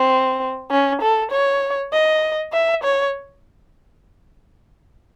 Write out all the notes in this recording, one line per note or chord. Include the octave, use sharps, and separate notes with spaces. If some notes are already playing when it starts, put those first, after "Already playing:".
Already playing: C4
C#4
A4
C#5
D#5
E5
C#5